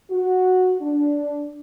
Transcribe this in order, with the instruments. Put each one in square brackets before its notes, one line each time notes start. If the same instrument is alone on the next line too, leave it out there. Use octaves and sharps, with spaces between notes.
[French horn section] F#4
D4